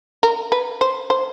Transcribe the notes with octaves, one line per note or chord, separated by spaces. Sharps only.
A#4
B4
C5
C5